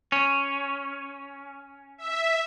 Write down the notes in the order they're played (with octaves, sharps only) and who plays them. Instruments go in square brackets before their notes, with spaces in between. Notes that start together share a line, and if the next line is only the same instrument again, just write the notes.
[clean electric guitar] C#4
[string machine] E5